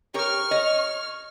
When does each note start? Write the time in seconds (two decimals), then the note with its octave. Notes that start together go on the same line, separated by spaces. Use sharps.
0.14 G4 A#4 C#5 C#6 F6
0.51 C#5 D#5